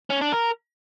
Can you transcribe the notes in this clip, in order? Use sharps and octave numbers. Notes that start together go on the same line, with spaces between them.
C#4
D4
A#4